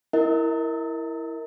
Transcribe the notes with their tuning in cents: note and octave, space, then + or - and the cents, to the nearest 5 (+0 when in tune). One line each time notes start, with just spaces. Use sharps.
E4 +0 A#4 +0 D#5 +35